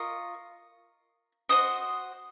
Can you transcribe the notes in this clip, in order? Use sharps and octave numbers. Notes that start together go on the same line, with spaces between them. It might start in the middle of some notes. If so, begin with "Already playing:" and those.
Already playing: F4 A#4 D#5 C#6
F#4 C5 D#5 D#6